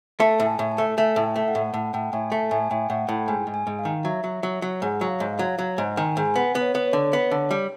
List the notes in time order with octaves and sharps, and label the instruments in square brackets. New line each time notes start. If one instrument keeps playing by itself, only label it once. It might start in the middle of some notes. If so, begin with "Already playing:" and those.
[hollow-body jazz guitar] A3 [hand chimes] A5
[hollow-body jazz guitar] A2
[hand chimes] G#5
[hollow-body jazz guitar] A2
[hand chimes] A5
[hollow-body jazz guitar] A3
[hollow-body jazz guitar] A3 [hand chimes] G#5
[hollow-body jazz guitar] A2
[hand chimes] G5
[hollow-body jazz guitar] A3
[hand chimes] F#5
[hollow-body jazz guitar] A2
[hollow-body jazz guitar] A2 [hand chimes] F#5
[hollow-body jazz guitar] A2 [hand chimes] G5
[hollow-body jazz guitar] A2 [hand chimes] G#5
[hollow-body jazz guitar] A3 [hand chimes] A5
[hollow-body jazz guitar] A2 [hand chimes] G#5
[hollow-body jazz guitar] A2 [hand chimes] G5
[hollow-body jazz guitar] A2 [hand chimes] F#5
[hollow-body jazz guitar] A2 [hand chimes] G5
[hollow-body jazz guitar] G#2 [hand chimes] G#5
[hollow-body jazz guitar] G#2
[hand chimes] G#5
[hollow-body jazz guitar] G#2
[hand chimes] F5
[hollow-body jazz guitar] D#3
[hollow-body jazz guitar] F#3 [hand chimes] E5
[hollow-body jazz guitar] F#3
F#3
F#3
[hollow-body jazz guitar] G#2 [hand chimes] F#5
[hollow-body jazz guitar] F#3
[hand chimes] F5
[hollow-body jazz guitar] G#2
[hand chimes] F5
[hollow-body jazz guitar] F#3
[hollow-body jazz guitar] F#3 [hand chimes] F#5
[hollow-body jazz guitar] G#2 [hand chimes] G#5
[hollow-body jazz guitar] D#3 [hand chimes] G#5
[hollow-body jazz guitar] G#2 [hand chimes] G#5
[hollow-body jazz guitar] B3 [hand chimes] F#5
[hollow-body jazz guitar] B3
[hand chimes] C#5
[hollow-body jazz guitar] B3
[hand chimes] C#5
[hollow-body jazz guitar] D3
B3
D3
G3